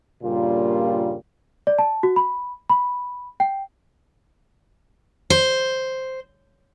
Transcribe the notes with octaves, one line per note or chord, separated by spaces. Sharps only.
G2 A#2 C#3 G3 A#3 F4
D5
A5
F#4
B5
B5
G5
C5